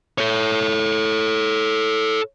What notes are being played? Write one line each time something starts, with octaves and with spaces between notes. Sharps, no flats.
A4 C#5